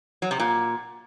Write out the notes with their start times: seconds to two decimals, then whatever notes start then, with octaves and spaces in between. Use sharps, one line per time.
0.22 F#3
0.31 C3
0.40 A#2